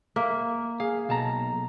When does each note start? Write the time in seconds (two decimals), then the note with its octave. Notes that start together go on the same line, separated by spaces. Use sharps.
0.16 A#3 E5
0.80 G#4 F5
1.09 B1 A5 A#5